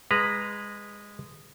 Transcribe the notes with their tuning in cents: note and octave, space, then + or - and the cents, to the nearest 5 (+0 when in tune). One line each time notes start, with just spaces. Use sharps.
G#3 -15 B4 +0 A#5 +0